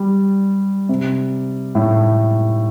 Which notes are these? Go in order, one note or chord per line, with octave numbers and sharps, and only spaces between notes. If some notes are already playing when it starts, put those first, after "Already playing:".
Already playing: G3
C3
A2